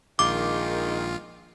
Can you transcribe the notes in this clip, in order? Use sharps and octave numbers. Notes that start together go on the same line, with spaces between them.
A#1 D#3 G#3 F4 D6